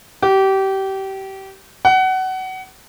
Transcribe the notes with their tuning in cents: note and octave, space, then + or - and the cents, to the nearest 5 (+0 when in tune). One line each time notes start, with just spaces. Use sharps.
G4 -25
F#5 +25